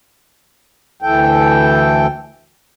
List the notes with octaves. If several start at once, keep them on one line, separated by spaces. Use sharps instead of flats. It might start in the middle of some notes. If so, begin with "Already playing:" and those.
D2 E3 A4 G5